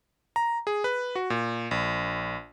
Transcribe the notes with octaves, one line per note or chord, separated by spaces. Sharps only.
A#5
G#4
B4
F#4
A#2
A#1